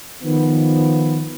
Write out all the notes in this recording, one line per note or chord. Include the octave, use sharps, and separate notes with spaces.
D#3 F3 B3